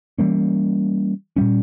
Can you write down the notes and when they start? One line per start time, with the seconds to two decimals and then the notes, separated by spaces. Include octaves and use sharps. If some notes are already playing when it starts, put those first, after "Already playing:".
0.19 E3 G3 A#3 C#4
1.36 A#2 G3 C#4